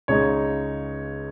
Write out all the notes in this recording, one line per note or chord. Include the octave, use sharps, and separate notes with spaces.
C#2 C#3 G#3 D#4 C#5